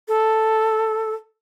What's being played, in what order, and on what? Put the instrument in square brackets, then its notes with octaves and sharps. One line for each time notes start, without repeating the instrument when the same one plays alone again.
[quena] A4